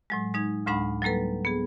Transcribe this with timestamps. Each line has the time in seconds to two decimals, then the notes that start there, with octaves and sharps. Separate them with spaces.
0.10 A2 F#3 G#3
0.34 G#3 D#4 G#6
0.66 D2 A2 G#3 D4 F#5 B5
1.02 F#3 G3 A#3 A4 B4
1.45 B3 G#4